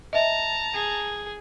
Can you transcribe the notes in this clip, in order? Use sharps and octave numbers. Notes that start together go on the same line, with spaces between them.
D#5 E5 A5 A#5
G#4